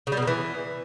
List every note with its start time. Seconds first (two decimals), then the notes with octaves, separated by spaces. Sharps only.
0.07 C#3
0.12 G3
0.17 B2
0.22 D#3
0.27 E3